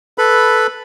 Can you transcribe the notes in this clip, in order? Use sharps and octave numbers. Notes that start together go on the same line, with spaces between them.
A4 B4 B5